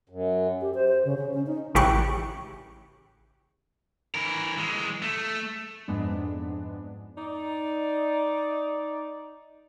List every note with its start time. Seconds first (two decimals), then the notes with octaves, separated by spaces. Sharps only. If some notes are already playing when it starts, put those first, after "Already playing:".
0.09 F#2
0.61 G4
0.74 C5
0.88 C5
1.05 C#3
1.17 C#3
1.34 C#4
1.47 D#4
1.75 A1 C#3 E4 G4 C#6 F#6
4.15 E3 A#4
4.57 E3 G#3
5.02 A3
5.88 F2 G#2 G#3 B3 D4
7.18 D#4 D5